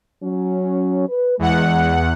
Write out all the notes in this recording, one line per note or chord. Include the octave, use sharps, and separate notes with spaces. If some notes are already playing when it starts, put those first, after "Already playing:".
F#3 C#4
B4
E2 G#3 F#5